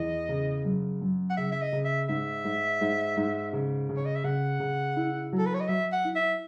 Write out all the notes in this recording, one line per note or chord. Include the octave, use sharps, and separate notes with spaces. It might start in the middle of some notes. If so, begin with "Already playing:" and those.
Already playing: E2 E3 D#5
C#3
F#2
F#2
F#5
C#3 E5
E5
D#5
C#3
E5
G#2 E5
G#2
G#2
G#2
C#3
C#3
C#5
D#5
E5
C#3 F#5
C#3
E4
F#3
A4
B4
C#5
D#5
F#3 E5
F#5
E4
E5